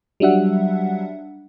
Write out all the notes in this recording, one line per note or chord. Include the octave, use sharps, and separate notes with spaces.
F#3 G3 D4 E5 F#5